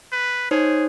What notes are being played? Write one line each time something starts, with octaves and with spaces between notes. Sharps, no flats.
B4
D#4 G#4 C5 C#5